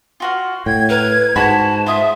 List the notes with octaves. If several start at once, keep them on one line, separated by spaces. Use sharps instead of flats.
F4 F#4 F5
A2 G5 G#6
A#4 B4
G#2 F#4 A5 B5
F4 E5 D#6